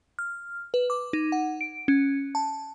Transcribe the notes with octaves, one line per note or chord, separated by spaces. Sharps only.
F6
B4
D6
D#4
F#5
D7
C#4
A5